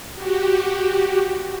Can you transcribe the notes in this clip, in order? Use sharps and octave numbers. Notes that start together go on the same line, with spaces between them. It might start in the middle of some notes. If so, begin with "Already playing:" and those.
F#4 G4